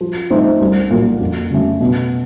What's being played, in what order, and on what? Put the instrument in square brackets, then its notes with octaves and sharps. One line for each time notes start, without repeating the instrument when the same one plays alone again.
[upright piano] F3
A3 C4 D#4
C2
A#2 F#3 A#3
F2
C#3 F#3 A3
B2